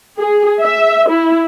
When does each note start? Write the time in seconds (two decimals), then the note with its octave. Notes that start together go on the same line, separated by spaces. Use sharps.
0.17 G#4
0.61 E5
1.09 E4